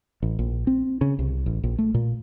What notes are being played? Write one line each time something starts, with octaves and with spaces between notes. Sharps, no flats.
A1
A#1
C4
C#3
C2
A1
A#1
A3
A#2